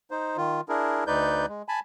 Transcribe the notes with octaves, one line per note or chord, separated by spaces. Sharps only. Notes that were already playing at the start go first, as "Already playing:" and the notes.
D#4 C5
D#3 F4
D4 E4 G#4 A#4
D2 D#4 B4 D5 G6
G#3
G#5 A5 B5